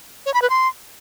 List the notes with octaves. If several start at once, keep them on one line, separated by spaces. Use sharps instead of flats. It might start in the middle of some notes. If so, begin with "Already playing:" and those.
C#5
B5
B4
C6